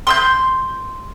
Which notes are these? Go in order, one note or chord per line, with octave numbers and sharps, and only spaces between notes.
C6 E6 G6